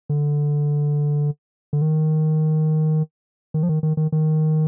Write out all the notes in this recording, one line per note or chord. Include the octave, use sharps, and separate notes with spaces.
D3
D3
D#3
D#3
F3
D#3
D#3
D#3
D#3